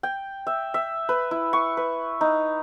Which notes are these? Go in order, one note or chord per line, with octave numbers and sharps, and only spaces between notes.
G5
E5
E5
B4
E4
C#6
B4
D#4